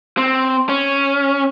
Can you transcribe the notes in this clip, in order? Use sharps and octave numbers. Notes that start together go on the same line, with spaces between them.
C4
C#4